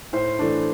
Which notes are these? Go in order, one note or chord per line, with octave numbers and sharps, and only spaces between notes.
A2 C5
E3 A3 D4